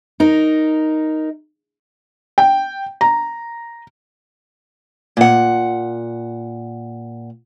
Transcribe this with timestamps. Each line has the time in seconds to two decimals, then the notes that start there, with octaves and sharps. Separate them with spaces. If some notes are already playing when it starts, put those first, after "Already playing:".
0.20 D#4 A#4
2.38 G5
3.01 A#5
5.17 A#2 F#5